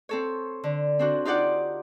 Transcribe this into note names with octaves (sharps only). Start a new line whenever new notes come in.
C4 A4 C#5
D3
C4 D4 F#4
D#4 F4 G4 D5 F#5